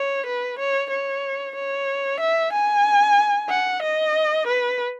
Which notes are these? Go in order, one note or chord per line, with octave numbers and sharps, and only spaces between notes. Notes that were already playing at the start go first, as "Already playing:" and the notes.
Already playing: C#5
B4
C#5
C#5
C#5
E5
G#5
F#5
D#5
B4